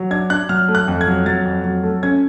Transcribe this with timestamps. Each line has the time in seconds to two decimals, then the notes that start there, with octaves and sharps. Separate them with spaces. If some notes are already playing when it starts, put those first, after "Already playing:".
Already playing: F#3
0.11 D4 G#6
0.30 D4 F#6
0.49 F#3 F6
0.68 A3
0.75 F#6
0.88 F2
1.01 G#6
1.07 F#3
1.26 F#3 A6
1.45 F2
1.65 F#3
1.83 A3
2.03 C#4 G#6